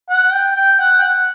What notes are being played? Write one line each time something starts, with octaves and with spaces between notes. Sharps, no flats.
F#5
G5
G5
F#5
G5
F#5